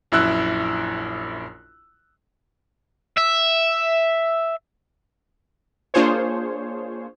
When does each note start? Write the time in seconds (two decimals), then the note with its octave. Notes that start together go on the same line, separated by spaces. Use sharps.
0.12 A#1 F#2 E4 E6 F#6
3.18 E5
5.94 A#3 D4 F4 G#4 C5 C#5